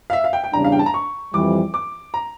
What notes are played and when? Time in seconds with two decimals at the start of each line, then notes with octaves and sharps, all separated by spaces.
0.10 F5
0.13 E5
0.24 F5
0.33 G5
0.44 G5
0.53 E2 C#3 G3 D4 A#5
0.64 F5
0.72 G5
0.79 A5
0.86 A#5
0.94 C#6
1.33 F2 E3 G3 D6
1.74 D6
2.14 A#5